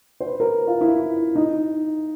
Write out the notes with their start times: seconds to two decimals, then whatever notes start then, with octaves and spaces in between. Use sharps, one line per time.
0.20 C5
0.26 B4
0.40 A#4
0.67 F4
0.81 E4
1.35 D#4